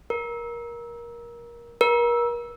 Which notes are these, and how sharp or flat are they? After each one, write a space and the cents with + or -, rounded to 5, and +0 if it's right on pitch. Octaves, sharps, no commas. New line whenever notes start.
A#4 +20
A#4 +35